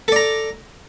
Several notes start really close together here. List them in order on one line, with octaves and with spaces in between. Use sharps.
A4 D5 A#5